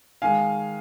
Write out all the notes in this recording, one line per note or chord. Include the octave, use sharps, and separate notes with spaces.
D#3 G#3 F5 G#5